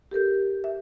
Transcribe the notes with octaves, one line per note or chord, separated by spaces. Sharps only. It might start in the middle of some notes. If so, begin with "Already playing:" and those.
G4 A4 A#4 G6
E5